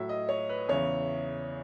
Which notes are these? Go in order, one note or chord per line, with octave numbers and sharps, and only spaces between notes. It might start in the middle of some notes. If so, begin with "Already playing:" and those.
Already playing: A2 F#3 E5
D#5
C#5
B4
E2 C#3 E3 C#5